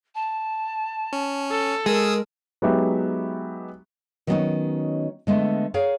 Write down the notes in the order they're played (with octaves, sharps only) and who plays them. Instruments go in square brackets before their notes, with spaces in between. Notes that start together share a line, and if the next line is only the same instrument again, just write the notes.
[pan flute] A5
[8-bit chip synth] C#4
[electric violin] A4
[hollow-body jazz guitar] G#3 [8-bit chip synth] G#4 D#6 E6 [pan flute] A#4
[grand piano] F#3 G#3 B3 D#4 G4 E5
[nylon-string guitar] D#3 F#3 G3 B3 C#4 D#4
D3 G#3 A3 B3
G#4 A#4 C#5 F5